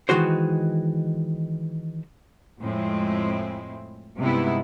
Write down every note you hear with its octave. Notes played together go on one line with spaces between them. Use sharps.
D#3 E3 G#3 F#4 C5
F2 A2 G#3 C4 E4
G2 C3 G#3 B3 D#4 E4